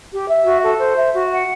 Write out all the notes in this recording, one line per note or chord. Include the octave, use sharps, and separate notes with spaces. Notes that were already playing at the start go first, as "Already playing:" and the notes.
G4
E5
F#4
A4
C5
E5
F#4
F#5